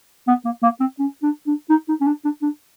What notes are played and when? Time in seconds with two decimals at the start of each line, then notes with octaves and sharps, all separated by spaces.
0.28 B3
0.45 A#3
0.63 A#3
0.80 C4
0.99 C#4
1.23 D4
1.47 D4
1.70 D#4
1.89 D#4
2.01 C#4
2.07 D4
2.24 D4
2.42 D4